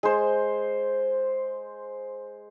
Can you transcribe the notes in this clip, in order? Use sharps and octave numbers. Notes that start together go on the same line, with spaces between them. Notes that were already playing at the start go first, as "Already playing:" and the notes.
G#3 C5